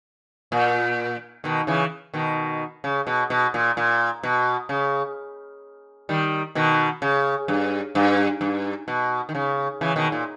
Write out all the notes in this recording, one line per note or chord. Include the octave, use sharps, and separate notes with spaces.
A#2
B2 D#3
C#3 E3
B2 D#3
C#3
B2
B2
A#2
A#2
B2
C#3
D#3 G3
B2 D#3
C#3
G2
G2
G2
B2
D#3
C#3
C#3 E3
B2 D#3
A#2